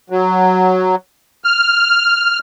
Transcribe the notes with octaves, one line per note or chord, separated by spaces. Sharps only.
F#3
F6